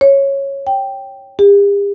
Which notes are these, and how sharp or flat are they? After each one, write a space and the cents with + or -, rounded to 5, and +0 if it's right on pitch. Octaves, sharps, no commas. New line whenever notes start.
C#5 -10
G5 +0
G4 +45